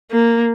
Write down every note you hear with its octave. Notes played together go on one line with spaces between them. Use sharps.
A#3